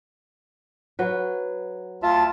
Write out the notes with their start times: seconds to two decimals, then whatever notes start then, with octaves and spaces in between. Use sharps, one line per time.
0.99 F#3 B4
2.03 D2 F4 E5 A5